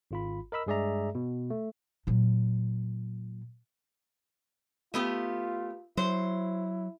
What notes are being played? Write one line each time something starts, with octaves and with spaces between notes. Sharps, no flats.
G#1 F4 B5
A#4 D#5 B5 E6
G2 G#3 G#4 D5 E5 A#5
B2
A3
A#2 F#3
A3 B3 F4 G4
F#3 E4 C5